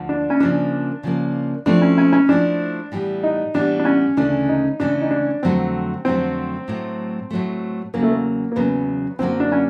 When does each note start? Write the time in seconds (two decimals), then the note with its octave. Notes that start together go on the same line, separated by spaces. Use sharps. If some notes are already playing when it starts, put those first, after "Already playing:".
Already playing: D2 D3 F3
0.09 D4
0.30 C#4
0.40 C#3 F3 A#3 D4
1.03 C#3 F3 A#3
1.66 F3 A3 C4 D4 E4
1.82 C#4
1.98 C#4
2.13 C#4
2.29 F3 A3 C4 D4 E4
2.92 A2 E3 G3 B3
3.23 D#4
3.54 A2 E3 G3 B3 D4
3.79 D4
3.85 C#4
4.17 D2 C#3 E3 A3 C#4 D4
4.49 D#4
4.80 D2 C#3 E3 A3 C#4 D4
5.01 D#4
5.11 D4
5.43 F2 D3 F#3 A3 C4
6.05 F2 D3 F#3 A3 C4
6.68 A2 F#3 A3
7.31 A2 F#3 A3
7.94 E2 C#3 F#3 A#3
8.03 A3
8.11 A#3
8.52 A#3
8.56 E2 C#3 F#3 B3
9.19 F#2 D3 F#3 A#3 C4
9.40 D4
9.52 C#4